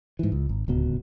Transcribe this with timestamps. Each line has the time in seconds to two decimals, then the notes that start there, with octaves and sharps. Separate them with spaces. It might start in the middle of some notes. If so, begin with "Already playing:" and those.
0.19 G#2 E3
0.32 C#2
0.49 G#1
0.68 D1 C#2 B2